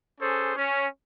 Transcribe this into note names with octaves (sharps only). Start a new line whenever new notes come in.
C#4 G#4 A4 C5
C#4